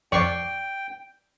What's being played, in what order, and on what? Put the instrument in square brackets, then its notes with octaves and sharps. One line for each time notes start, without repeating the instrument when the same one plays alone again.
[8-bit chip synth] F2 C7 [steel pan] D5 C#6 [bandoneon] G5